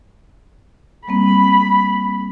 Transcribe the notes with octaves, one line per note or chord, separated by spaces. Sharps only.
G3 A#3 C4 B5